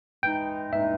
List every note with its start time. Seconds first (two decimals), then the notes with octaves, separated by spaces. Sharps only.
0.23 E3 G#3 D#4 G5
0.73 E3 G#3 D#4 E5